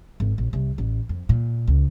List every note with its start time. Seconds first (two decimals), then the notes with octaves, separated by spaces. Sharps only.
0.20 G#1
0.38 A#1
0.53 C2
0.78 A1
1.09 F2
1.29 A#2
1.67 C#2